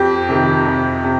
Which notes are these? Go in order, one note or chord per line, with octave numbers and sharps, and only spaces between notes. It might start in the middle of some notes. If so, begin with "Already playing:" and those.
Already playing: F2 G4
C3 D#3
F2
C3